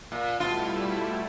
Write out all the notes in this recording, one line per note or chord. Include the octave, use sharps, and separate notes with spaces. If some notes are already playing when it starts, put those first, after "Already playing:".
A#2
B2 G3 A3 E4 F4